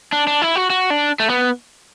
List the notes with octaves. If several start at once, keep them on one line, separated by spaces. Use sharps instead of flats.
D4
D4
E4
F#4
F#4
D4
A3
B3